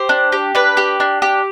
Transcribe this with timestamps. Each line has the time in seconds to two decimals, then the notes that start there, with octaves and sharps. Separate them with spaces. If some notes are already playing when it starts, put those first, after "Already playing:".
Already playing: G4 C5
0.09 D4
0.32 G4
0.55 D4 B4
0.77 G4
1.00 D4
1.22 G4